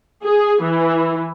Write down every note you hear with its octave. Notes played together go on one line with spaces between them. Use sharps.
G#4
E3